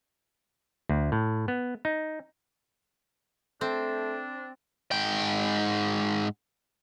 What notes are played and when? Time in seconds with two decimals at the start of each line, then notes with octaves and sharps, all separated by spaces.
0.89 D2
1.12 A2
1.48 B3
1.85 D#4
3.61 A3 C4 D4
4.92 G#2 G5